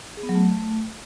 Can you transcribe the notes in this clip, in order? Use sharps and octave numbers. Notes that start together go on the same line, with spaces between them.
G#4
B3
F#3
A3